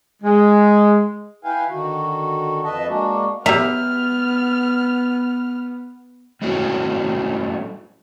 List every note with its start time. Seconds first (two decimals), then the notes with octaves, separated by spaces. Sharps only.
0.23 G#3
1.44 E4 B4 F5 G5 G#5
1.69 D3 D#3 F#4
2.64 F2 B4 D#5 E5 A5
2.87 G#3 A#3 D4 F#4
3.46 B3 G4 E5 A#5 F6
6.42 G3 A3 C#4 E4 F#4